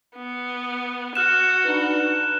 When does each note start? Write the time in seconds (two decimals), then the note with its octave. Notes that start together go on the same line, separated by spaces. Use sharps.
0.16 B3
1.15 F#4 F6 F#6 E7
1.65 D4 D#4 B4